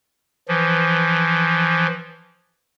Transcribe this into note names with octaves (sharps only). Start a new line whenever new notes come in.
E3 F3